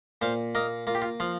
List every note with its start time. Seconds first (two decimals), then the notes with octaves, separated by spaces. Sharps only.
0.22 A#2 C5 F5
0.55 A#3 A#4 D#5
0.87 A#3 F4
0.95 G4
1.02 F4
1.20 F3 F4